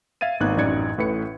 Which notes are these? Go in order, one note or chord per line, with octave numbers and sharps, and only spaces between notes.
E5 F5 G#6 A6 D#7
G#1 A#3 B3 D#4 F#6 G#6
A1 F#2 D#4 D5 G#6 C#7
A1 A2 B4 C#7